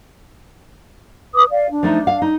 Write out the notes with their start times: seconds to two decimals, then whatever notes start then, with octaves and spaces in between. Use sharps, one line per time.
1.34 B4 D6 D#6
1.50 D5 F5
1.70 D4
1.83 F3 A3 D#4
2.07 F5
2.22 D#4